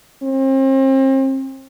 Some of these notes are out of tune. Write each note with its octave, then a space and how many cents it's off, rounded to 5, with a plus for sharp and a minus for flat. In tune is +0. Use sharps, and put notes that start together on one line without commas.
C4 +40